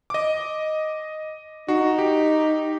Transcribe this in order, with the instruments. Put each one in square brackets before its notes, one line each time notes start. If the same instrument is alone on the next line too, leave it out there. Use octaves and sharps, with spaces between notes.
[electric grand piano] D#5 D6
[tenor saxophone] D#4 [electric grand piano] F#4
[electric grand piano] G4